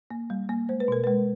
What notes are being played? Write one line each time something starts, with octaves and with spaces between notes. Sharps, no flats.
A#3
G3
A#3
G#3 C5
B4
B2 A#4
G#3 B4